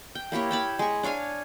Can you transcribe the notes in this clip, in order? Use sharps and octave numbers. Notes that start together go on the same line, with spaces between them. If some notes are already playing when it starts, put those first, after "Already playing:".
G5
A#3 E4 G4 C#5
G5 A5 B5
G#3 C#6
D4 C#5 F5 G#5